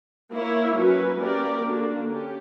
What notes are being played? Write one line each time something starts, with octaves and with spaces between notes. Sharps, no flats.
A#3 E4 A#4 C#5
F#3 C#4 F#4 B4
A#3 C#4 G4 A#4 D5
D3 A#3 D4 F#4
C#4 G4